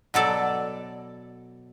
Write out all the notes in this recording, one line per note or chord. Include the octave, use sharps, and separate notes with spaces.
B2 F#3 A4 D5